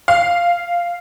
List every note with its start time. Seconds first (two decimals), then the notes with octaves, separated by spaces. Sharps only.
0.08 F5